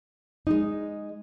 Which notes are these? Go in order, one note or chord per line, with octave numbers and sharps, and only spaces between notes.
G#3 D#4